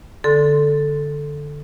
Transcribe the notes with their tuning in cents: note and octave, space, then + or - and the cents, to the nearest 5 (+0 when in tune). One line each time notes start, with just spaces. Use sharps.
D3 +0 A4 +0 C6 +0